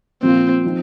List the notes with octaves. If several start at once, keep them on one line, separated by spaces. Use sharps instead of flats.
A#2 F3 A#3 C4 F4
F3 C4 D#4